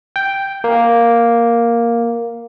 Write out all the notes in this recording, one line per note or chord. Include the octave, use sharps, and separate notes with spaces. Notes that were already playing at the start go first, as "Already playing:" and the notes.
G5
A#3